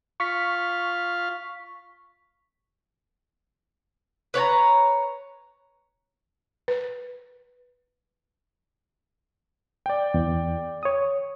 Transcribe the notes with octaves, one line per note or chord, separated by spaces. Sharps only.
F4 F5 C#6 B6
B4 C#5 G#5 A#5
B4
D5 G5
E2
C#5 D#6